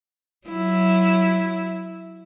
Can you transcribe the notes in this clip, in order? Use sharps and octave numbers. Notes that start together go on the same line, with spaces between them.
F#3 E4